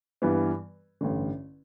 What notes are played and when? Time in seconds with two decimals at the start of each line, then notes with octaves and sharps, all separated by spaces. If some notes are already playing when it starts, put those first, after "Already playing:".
0.22 G2 E3 G3 B3
1.01 A1 G2 D3